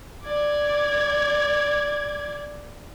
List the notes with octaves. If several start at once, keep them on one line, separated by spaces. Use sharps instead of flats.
D5 G#6